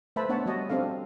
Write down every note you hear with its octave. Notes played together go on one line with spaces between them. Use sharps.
A3 B4 C5 E5 A5 B5
B3 D4 C#5 F#5 A5
G3 F#4 C#5 D#5 A5
C4 D4 A4 F5